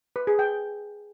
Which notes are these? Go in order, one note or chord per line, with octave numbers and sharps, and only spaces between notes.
B4
G#4
G5